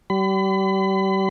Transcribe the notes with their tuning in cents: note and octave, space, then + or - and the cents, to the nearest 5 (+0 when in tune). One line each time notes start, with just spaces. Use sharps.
G3 -35 B5 +35